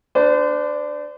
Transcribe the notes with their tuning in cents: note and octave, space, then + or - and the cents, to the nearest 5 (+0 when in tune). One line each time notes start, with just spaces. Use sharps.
D4 +0 C5 -35